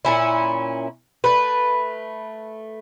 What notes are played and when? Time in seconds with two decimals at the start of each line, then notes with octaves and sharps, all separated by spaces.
0.05 A#2 C#4 E4
1.24 A3 B4